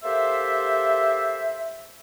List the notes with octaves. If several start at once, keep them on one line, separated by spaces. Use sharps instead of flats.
A#3 G4 A4 C5 E5